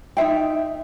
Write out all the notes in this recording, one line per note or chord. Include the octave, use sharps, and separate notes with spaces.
D#4 F#4 E5 G5